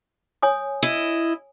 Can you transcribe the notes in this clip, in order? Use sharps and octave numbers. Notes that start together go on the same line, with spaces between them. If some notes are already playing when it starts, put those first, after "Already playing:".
C#5 G#5 D#6
E4 D#5